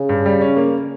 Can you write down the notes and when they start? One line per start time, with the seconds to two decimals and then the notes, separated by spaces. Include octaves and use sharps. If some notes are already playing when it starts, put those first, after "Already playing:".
Already playing: C#3
0.09 G2
0.26 G3
0.41 C#4
0.57 A#3